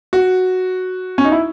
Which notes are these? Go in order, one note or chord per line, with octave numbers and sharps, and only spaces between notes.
F#4
C#4
D#4
E4